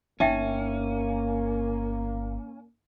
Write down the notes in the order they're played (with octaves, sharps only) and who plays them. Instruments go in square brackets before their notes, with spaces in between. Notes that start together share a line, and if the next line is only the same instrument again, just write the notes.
[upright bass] G1 [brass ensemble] A#3 [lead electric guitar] C#4 [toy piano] D#4 E5 G5